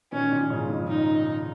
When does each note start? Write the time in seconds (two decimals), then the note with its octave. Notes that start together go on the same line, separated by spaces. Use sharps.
0.12 A#2 D#3 C#4
0.31 A#2 D#3
0.50 G#2 C#3
0.70 F2 A#2
0.88 D#4